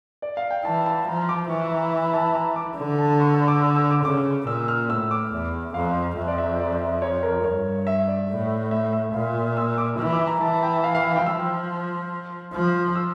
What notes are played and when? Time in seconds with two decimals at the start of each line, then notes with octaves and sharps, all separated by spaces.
0.22 D5
0.37 F5
0.51 G5
0.65 E3 A5
0.86 A5
1.08 F3 A#5
1.29 D6
1.50 E3 C#6
1.71 A#5
2.13 A5
2.35 A#5
2.56 D6
2.77 D3
2.98 A5
3.20 C#6
3.34 E6
3.48 D6
3.62 E6
3.76 E6
3.91 D6
4.04 C#3 D6
4.47 A#2 E6
4.68 F6
4.89 A2 E6
5.11 D6
5.33 E2
5.74 F2 F5
6.17 F2 E5
6.28 D5
6.38 E5
6.59 D5
6.81 E5
7.02 C#5
7.23 A#4
7.44 G2 C#5
7.87 E5
8.08 D5
8.29 A2
8.71 E5
8.93 E5
9.13 A#2 F5
9.57 E6
9.78 D6
9.99 E3 E6
10.13 D6
10.27 A#5
10.41 E3 A5
10.63 G5
10.84 F5
10.95 F5
11.05 F5
11.16 G5
11.26 F3 E6
12.53 F3
12.96 E6